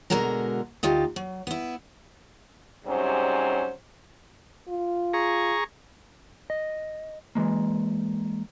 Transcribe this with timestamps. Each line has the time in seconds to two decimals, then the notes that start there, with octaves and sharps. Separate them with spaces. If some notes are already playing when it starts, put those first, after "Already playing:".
0.10 B2 D3 G#3 F#4 A#4 A#5
0.83 D2 D#4 F4 G4
1.16 F#3
1.47 B3 E4
2.86 G#2 C3 F#3 G3 C#4 C5
4.68 F4
5.13 G#4 A#5 C#6
6.50 D#5
7.35 E3 G#3 A#3